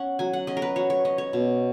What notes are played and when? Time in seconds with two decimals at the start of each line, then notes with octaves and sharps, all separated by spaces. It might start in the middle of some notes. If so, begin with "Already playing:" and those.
Already playing: C#4 F#5
0.19 F#3 G#5
0.33 F#5
0.47 C#4 D#5
0.57 A#4
0.62 B4
0.76 F#3 C#5
0.90 C#5
1.05 C#4 D#5
1.18 C#5
1.33 B2